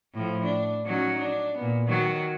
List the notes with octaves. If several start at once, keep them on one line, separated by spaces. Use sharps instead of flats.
A2 F3
D4
F#3 C#4 D#4
D4
A#2 B3
D#3 F#3